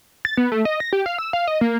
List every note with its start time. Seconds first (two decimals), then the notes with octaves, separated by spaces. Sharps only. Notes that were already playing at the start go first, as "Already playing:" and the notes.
0.25 A6
0.37 B3
0.52 A3
0.65 D#5
0.80 A#6
0.93 G4
1.06 F5
1.18 E6
1.33 F5
1.48 D#5
1.61 A#3